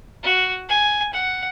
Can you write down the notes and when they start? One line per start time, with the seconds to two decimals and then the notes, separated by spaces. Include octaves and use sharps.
0.23 F#4
0.69 G#5
1.13 F#5